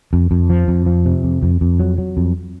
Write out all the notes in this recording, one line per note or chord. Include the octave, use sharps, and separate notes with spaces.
F2
F2
F3
F2
F3
C3
F2
F2
F2
F#3
F#3
F2